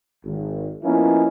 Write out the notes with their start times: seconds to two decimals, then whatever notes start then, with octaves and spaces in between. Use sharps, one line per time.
0.24 G#1
0.82 F3 A#3 B3 C#4 D#4 E4